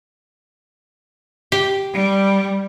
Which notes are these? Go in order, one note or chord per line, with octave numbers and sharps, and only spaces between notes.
G4
G3